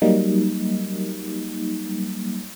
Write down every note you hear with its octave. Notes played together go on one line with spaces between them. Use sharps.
F#3 G3 A#3 D#4